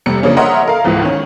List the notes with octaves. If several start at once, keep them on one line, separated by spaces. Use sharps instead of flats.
F1 C3 G3 C#7
C#3 F3 A#3 C#4 D4
A#4 C#5 D#5 E5 F#5 C6
A4 A#4 F5
C#2 G#2 E3 F3
D#3 C#4